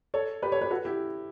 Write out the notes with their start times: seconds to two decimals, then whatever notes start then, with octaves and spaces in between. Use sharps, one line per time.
0.14 A4 C#5
0.42 G4 B4
0.52 A4 C#5
0.61 G4 B4
0.70 F#4 A4
0.85 E4 G4